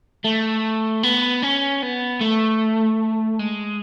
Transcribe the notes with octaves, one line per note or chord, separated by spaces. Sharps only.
A3
B3
C#4
B3
A3
G#3